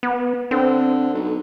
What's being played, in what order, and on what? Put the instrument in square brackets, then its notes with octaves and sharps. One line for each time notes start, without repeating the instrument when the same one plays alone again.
[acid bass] B3
[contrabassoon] D3 [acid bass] C4
[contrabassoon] B1